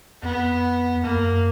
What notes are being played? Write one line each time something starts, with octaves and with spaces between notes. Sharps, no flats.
F2 B3
F#2 A#3